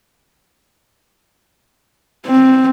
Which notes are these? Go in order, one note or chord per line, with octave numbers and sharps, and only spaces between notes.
C4